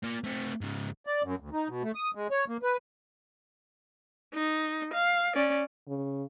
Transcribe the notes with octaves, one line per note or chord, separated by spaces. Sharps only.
A#3 F4
A3 C4
G#2 C#3
D5
F#2
D2
D#4
B2
A3
D#6
G#3
C#5
A#3
B4
D#4
F5
C#4 D5
C#3